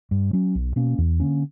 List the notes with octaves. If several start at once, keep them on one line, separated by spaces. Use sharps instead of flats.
G2
F#3 C#4
B1
B2 A#3 C#4
E2
D3 A#3 C#4